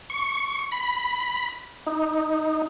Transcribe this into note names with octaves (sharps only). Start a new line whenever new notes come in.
C#6
B5
D#4